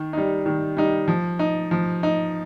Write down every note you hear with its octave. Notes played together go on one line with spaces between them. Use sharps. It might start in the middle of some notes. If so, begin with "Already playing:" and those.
Already playing: D#3
G3 D#4
D#3
G3 D#4
F3
D#4
F3
D#4